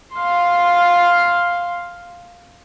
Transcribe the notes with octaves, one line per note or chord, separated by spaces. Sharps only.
F5 C6